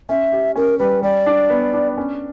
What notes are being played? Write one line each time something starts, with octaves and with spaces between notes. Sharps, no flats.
C#4 E5
G4
C#4 A#4
G3 B4
G3 D5
D4
B3
D4
C#4